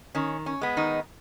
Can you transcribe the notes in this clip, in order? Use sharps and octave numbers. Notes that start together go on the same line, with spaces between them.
D#3 C#4
C#4
G#3 B3
D#3 D#4